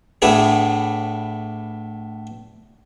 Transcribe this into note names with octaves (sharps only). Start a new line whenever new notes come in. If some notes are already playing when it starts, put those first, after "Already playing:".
A2 A3 B3 D4 G#4